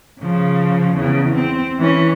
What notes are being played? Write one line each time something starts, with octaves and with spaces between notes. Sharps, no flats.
C#3 F3
E2 C#3
C4
E3 C#4